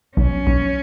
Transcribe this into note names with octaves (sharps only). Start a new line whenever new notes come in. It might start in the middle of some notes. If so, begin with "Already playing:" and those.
B1 C#4
B1